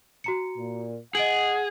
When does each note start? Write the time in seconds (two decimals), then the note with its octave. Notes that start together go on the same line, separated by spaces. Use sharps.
0.24 F#4 A#5 C#7
0.57 A#2
1.15 G#4 D#5 F#5 D7 F#7